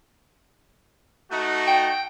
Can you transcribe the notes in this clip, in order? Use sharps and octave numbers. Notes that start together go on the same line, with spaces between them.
A3 D#4 F#4
G5